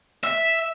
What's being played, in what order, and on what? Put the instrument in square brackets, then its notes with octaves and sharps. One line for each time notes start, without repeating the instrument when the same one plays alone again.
[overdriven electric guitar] E5